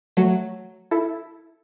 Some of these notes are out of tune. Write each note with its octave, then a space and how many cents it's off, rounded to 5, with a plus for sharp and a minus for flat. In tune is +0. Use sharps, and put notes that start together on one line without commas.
F#3 +0 A3 +0
E4 +0 A4 +0